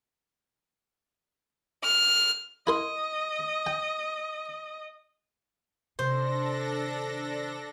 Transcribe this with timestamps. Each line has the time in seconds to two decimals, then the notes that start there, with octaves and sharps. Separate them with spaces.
1.83 F6
2.67 E4 A#4 D#5 C6
3.67 G5
5.99 C3 D#3 D4 A4 C5 A#6